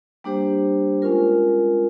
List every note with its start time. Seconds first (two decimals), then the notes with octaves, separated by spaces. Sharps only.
0.24 G3 A#3 D4 G4 C5
1.02 G#3 C#4 F4 A#4